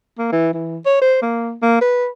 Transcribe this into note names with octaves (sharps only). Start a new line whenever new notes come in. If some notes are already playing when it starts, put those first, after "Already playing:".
A#3
E3
E3
C#5
C5
A#3
A#3
B4